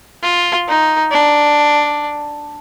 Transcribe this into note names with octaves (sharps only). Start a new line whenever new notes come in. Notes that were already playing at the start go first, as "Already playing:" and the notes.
F4
D#4
D4